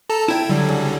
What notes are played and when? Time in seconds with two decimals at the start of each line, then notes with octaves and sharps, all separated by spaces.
0.10 A4 A5 A#5
0.28 E4 E5 G5 G#6
0.49 D3 F#3 G3
0.69 C#2